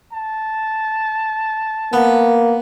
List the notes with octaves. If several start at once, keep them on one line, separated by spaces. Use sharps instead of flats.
A5
A#3 B3